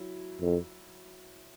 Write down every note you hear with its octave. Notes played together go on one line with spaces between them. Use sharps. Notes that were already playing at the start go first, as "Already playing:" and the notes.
Already playing: F#3 E4
F2